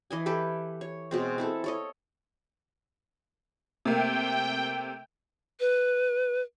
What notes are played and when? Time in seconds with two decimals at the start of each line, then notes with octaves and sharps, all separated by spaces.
0.11 E3 D#5 G#5
0.26 E4 G4 A4 B4
0.81 C#5
1.11 B2 G#3 C4
1.38 C4 E4 A4
1.64 A4 C#5 D#5
3.85 C3 A3 A#3 G5
5.60 B4